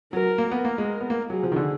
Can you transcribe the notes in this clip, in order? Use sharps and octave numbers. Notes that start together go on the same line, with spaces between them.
F#3 A#4
A#3
B3 A#4
A#3
G#3
B3
A#3
F#3 G#4
F3
D#3
D3